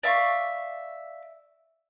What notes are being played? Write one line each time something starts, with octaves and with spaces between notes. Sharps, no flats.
D5 E5 F5 C#6